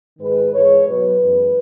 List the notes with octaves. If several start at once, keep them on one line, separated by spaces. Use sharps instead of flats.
G#2 D#3 G#3 B4
G#2 E3 G#3 C#5
B2 F#3 B4
F#2 E3 G#3